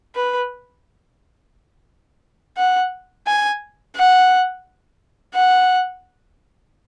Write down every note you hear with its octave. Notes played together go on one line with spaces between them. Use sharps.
B4
F#5
G#5
F#5
F#5